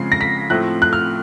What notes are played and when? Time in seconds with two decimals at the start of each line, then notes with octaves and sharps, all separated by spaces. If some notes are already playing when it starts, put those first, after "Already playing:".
Already playing: C#3 F3 G#3 C4 C7
0.12 A#6
0.21 B6
0.50 A2 F3 A3 C4 F#6
0.82 F#6
0.93 F6